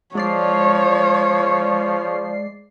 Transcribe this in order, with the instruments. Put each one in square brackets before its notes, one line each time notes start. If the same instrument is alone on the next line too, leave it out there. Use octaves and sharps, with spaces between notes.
[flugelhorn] F3 [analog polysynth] G#3 D5 C7 [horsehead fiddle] C#5